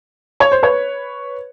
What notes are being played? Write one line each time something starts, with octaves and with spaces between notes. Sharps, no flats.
C#5
C5
B4 C#5